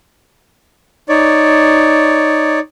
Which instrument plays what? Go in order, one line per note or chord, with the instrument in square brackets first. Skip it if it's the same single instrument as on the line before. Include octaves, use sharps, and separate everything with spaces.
[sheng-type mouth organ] D#4 C#5 D5